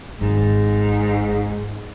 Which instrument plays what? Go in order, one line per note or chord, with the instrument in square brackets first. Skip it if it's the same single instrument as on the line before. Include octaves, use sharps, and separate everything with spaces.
[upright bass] G#1 [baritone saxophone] G#2